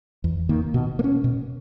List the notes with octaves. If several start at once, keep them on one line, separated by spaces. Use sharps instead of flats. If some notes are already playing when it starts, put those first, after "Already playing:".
E2
D#3 A#3
B2
A#3
C#4
B2